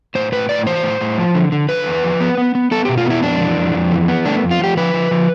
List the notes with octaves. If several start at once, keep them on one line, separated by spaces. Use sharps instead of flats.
A2 C5
A2 B4
A2 D5
E3 C5
A2
A2
F3
D3
D3
D3 B4
E2
F3
B3
B3
B3
B3 A4
B2 G4
F4
B3 E4
F2 D4
E3
F2
F2
E3
B3
A3 D4
F2
F4
F3 G4
F3 B4
F3
F3